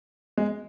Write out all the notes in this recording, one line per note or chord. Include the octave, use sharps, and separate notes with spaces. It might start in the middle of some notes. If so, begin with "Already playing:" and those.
G#3